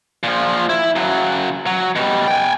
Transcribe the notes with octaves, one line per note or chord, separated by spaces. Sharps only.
A#2 F3
E4
C#3 F#3
F#3
B2 G3
G5 G#5